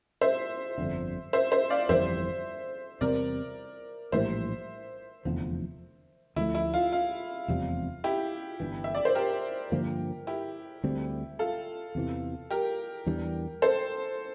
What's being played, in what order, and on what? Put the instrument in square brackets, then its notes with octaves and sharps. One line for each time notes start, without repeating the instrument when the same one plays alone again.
[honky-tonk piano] C5 E5
[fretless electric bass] G1 F2 D3
[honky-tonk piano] C5 E5
C5 E5
D5 F5
[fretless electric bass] G1 F2 E3 G3 [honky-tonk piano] C5 E5
[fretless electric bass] E2 C3 G3 C4 [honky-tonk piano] A#4 D5
[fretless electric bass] A#1 A2 E3 G3 [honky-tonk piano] C5 E5
[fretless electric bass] F1 E2 D3 F3
[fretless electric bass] D2 C3 F3 A3 [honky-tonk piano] E4
[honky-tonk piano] E4
F4
F4
[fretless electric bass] F1 E2 C3 G3
[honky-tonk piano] E4 G4
[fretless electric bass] G1 G2 E3
[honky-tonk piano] E5
D5
C5
G4 A#4
[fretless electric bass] G2 D3 F3 A#3
[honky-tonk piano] E4 G4
[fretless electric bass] D2 D3 G3 C4
[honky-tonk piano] F4 A4
[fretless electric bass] E2 C3 E3
[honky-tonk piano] G4 A#4
[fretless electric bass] E2 E3 G3 D4
[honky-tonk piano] A4 C5